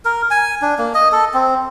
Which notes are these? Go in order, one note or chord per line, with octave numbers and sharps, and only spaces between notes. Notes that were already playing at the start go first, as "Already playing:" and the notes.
A#4
G#5
D4
A#3
D#5
A4
C4